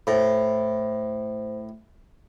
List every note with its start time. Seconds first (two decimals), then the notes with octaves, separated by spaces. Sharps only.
0.07 A2 C5